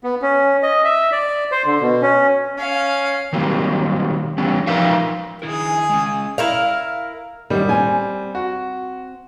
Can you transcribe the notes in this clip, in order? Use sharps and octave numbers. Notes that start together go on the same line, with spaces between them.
B3
C#4
D#5
E5
D5
C5
D3
B2
C#4
C#4 F5
D#3 F#3 G3 A#3 C4
E3 G3 B3 C#4
F3 D#4 A#4 B4 E5 F5
D#3 E4 G#4 A#4
G#5
G#3 C#4
E4 A#4 F5
F#2 D#3 G3
C4 G#5
F#4